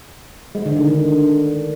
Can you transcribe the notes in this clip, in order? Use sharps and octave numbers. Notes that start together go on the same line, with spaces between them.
G#3
D3
D#3
D3